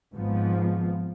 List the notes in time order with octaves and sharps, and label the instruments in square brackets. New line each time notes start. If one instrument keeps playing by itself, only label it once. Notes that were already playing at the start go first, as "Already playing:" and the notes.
[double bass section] G#1 G#2 F3 B3